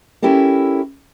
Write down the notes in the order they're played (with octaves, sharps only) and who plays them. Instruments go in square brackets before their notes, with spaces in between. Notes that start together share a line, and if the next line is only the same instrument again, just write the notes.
[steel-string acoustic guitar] C#4 E4 G4 A4 A#4